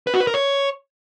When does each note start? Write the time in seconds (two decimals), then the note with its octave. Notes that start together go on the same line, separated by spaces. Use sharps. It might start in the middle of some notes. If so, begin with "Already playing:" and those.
0.07 B4
0.14 F#4
0.20 B4
0.27 A#4
0.34 C#5